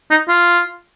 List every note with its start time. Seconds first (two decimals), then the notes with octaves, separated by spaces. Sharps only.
0.11 D#4
0.28 F4